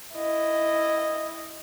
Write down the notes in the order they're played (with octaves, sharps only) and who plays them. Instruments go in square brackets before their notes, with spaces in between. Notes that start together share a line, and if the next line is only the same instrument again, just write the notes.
[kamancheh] E4 D#5